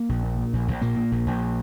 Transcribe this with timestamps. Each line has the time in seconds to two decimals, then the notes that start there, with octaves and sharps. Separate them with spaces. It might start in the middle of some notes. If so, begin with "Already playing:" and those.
Already playing: A#3
0.09 A#1
0.23 A#2
0.38 A#2
0.53 A#1
0.68 A#1
0.81 A#2 A#3
0.97 A#2
1.11 A#1
1.26 A#1